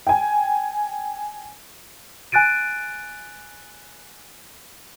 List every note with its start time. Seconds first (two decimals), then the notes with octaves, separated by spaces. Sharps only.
0.07 G5 G#5
2.32 G#5 F#6 A6 D7 D#7